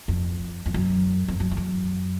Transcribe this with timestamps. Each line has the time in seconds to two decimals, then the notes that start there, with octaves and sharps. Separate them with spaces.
0.08 F2
0.66 F2
0.74 F#2
1.28 F2
1.40 F#2
1.51 F2
1.57 F#2